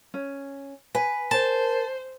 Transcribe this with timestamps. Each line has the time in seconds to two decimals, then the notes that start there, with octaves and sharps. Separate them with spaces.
0.14 C#4
0.95 B4 G#5
1.31 A#4 C5 A5